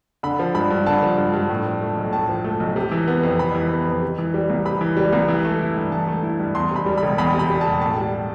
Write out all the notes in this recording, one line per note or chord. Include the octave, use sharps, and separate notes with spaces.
D3 B5
F3
G2 B5
G2
D3 A5
F3
G2
G2
A2
F3
A3
B1
A2 A5
F3
A3
B1
C3
E3
B3
F2
C3 B5
E3
B3
F2
C3
E3
G3
C2
C3 B5
E3
G3
C2
E3
A3
E4
G2
E3 A5
A3
E4
G2
E2 C6
C3 B5
G3
B5
E1
E2 B5
C3
B5
G3
E1 A5
A2 A5
G3